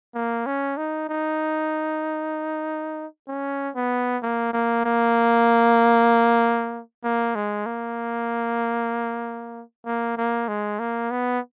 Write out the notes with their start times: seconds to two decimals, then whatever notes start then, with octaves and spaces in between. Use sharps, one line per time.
0.15 A#3
0.46 C#4
0.77 D#4
1.09 D#4
3.28 C#4
3.75 B3
4.22 A#3
4.53 A#3
4.85 A#3
7.04 A#3
7.35 G#3
7.66 A#3
9.86 A#3
10.17 A#3
10.48 G#3
10.79 A#3
11.11 B3